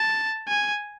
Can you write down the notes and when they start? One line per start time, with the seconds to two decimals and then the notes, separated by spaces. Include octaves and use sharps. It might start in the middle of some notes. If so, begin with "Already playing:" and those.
Already playing: A5
0.48 G#5